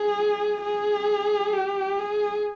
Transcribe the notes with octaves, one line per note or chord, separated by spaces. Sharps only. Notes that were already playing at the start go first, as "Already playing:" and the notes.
Already playing: G#4
G#4
G4
G#4